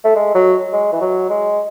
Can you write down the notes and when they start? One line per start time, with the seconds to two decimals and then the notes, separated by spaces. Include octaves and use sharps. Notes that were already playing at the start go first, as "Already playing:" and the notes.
0.04 A3
0.16 G#3
0.35 F#3
0.72 G#3
0.93 E3
1.01 F#3
1.30 G#3